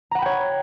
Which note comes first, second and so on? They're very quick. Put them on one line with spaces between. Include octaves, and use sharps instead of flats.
A#5 F#5 B5 G5 C#5